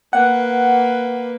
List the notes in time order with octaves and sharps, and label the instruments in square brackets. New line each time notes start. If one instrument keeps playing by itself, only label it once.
[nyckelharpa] A#3 B4 [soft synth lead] F#5